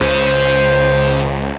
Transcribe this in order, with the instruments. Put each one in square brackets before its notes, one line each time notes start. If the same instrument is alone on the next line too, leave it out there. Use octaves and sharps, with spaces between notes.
[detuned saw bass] C#2 [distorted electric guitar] C#3 [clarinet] C5